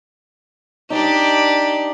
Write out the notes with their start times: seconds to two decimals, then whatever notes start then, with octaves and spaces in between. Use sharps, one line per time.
0.90 D4 D#4 G4 D5